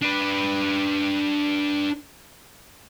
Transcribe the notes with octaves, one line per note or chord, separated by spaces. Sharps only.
D4 B4